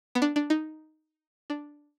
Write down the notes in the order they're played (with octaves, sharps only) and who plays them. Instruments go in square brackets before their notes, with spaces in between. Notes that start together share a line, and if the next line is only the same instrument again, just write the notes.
[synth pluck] B3
D4
D4
D#4
D4